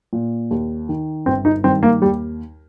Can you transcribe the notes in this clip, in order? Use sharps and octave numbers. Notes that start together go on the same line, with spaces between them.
A#2
D#2
D#3
G1 C4
D#4
G2 D#3 C4
A#3
D#2 G3